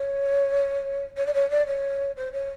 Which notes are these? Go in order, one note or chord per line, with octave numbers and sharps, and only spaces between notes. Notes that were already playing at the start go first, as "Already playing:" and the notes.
Already playing: C#5
C#5
D5
C#5
D5
C#5
C5
C#5